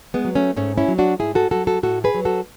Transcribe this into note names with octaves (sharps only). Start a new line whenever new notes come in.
G#3 B3
F#3
A3 C#4
G#2 A3 C#4
C#4 E4
F#3
D4 F#4
G#2 E4 G#4
F#4 A4
F#3 F#4 A4
F#4 A4
A2 F#4 A4
G#4 B4
F#3
F#4 A4